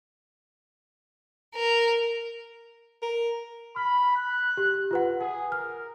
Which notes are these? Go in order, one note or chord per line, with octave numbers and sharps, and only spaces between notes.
A#4
A#4
B5 F6
F#6
G4
F4 B4 F#5
G#4 F#5
A#4 F6